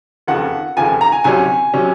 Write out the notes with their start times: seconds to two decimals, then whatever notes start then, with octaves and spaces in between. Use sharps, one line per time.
0.27 F1 D#2 C#3 F3 F#5
0.77 F1 D#2 C#3 F3 G#5
1.01 A#5
1.12 G#5
1.24 C2 C3 F#3 C#4 G#5
1.74 C3 F#3 C#4